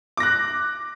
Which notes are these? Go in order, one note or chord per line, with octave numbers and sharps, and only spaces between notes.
D6 F#6 A#6